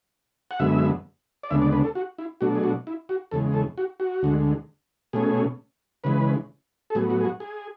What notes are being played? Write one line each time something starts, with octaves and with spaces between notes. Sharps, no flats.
F#5
F#2 D3 G#3 B3 E5
D5
D2 C#3 G#3 B3 D4 E5
D5
B4
A4
F#4
E4
B2 F#3 A3 D4 F#4
G#4
F#4
E4
F#4
E2 C#3 G#3 A4
A4
F#4
F#4
D2 D3 G#3
B2 A3 C#4 G#4
C#3 E3 G#3 B4
A4
A2 F#3 B3 G#4
F#4
G#4
F#4
G#4